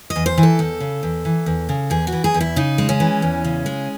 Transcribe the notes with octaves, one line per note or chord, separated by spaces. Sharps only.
D#5
E2
C5
E3
A4
E2
C#3
E2
E3
E2
C#3
E2 G#4
F#4
E3
G#4
E2
E4
C#3 D#4
G#3
C#4
E3
E2
C#3
G#3